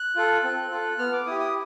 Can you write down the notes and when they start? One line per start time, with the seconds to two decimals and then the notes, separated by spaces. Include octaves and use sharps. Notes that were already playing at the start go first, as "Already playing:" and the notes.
Already playing: F#6
0.16 F4 A4
0.44 C4
0.71 F4 A4
0.98 B3 F6
1.13 D6
1.26 E4 G4 D#6
1.40 D#6